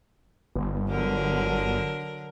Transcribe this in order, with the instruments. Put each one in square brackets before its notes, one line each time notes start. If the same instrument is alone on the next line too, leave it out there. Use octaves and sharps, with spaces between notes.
[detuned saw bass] G1
[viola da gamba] D3 F#3 A#4